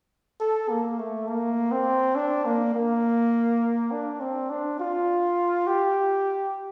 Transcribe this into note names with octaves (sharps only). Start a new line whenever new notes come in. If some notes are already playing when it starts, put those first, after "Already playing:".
A4
A#3
A3
A#3
C4
D4
A#3
A#3
D4
C4
D4
F4
G4